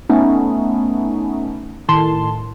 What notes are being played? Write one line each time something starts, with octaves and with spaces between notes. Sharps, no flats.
A3 B3 C#4 D#4
A2 D#3 A5 C6